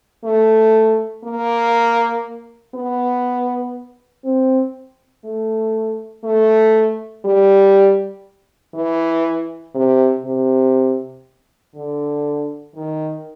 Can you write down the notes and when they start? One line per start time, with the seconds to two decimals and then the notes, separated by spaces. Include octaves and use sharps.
0.24 A3
1.24 A#3
2.74 B3
4.24 C4
5.24 A3
6.24 A3
7.24 G3
8.74 E3
9.74 C3
10.25 C3
11.75 D3
12.75 D#3